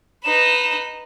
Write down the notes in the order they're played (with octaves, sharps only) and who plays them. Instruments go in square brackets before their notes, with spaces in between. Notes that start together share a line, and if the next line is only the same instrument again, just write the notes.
[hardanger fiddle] D#4 B4 [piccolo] E7